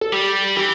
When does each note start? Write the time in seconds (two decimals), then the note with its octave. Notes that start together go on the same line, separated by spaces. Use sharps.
0.01 A4
0.13 G3 G4
0.56 E3 G4